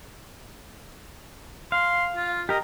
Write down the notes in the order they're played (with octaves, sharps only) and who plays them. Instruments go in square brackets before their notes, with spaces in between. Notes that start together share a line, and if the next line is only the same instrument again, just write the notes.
[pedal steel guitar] F5 [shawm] C6
[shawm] F4
[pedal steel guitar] G4 A#4 [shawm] D#5